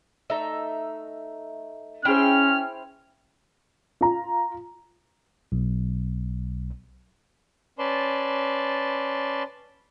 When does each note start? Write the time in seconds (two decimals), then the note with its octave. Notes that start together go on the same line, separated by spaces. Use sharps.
0.30 A3 D#4 E5
2.05 C#4 E4 G#4 C5 G5 F6
4.01 F4 A#5
5.52 B1
7.79 C#4 B4 D5 A5 C6